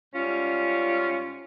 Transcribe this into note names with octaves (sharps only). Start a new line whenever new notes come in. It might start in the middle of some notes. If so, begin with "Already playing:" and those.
G#2 G3 C#4 F4